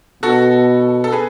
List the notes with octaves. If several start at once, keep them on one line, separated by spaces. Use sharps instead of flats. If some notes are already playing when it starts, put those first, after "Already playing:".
B2 F#4 A4
A4
G#4 B4